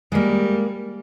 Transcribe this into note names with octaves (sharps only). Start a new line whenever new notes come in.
G3 G#3 A#3